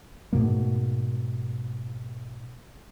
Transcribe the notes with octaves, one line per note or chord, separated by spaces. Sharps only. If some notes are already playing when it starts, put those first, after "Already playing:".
G#2 B2 A3 A#3